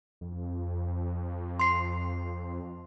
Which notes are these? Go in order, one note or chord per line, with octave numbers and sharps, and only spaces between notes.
F2
C6 C7